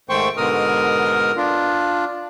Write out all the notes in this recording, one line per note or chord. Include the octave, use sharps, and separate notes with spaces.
G#2 D#3 A3 C5 G5 C#6
G#2 B2 D3 A#4 D#6 F6
D4 F4